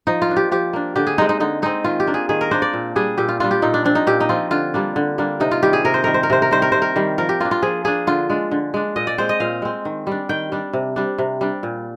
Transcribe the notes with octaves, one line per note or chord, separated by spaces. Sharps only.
F3 D#4
F4
A#3 D4
G4
F3 G4
A#3 D4
D3 G4
G#4
G#3 C4 D#4
D#4
D3 D#4
G#3 C4 D#4
D#3 F4
G4
A#3 D4
G#4
D#3 G#4
A#4
A#3 D4 C5
D5
A#2
G3 D4 G#4
A#2 G4
F4
G3 D4 F4
G4
A#2 D#4
D4
F3 C4 D4
D#4
A#2 G4
D#4
F3 C4 F4
D3 F4
G3 A#3 D4
D3
G3 A#3 D4
C3 D#4
F4
D#3 G3 G4
G#4
C3 A#4
C5
D#3 G3 A#4
C5
A#4
C3 C5
A#4
D#3 G3 C5
A#4
C3 C5
A#4
D#3 G3
F3 A#4
G4
A#3 D4 F4
F4
F3 G#4
A#3 D4 G#4
D3 F4
G#3 D4
D3
G#3 D4
A#2 D#5
D5
G#3 C4 C5
D#5
A#2 F5
G#3 C4
D#3
G3 D4
D#3 G5
G3 D4
C3
G3 D4
C3
G3 D4
A#2